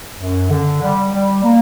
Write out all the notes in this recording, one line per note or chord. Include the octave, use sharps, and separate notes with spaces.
F#2
D3
G3
G3
A#3